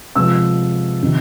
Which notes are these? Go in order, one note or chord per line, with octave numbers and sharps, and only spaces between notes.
C3 F3 G#3 B3 E6
C3 D#3